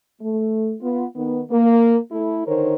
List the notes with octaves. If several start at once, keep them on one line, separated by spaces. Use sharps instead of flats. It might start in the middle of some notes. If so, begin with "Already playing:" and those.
A3
B3 F4
D#3 B3
A#3
A3 E4
D3 D#3 D#4 A#4 C5 C#5